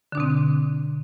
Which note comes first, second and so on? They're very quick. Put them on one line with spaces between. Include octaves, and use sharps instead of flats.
D3 D4 B2 C4